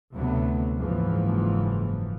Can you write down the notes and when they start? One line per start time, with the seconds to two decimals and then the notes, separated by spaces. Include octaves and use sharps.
0.14 D2 C3 F#3 A3 B3
0.78 F#1 G#2 E3 F3